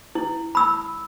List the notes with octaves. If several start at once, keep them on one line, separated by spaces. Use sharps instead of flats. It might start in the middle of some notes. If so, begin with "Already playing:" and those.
E4
B5 E6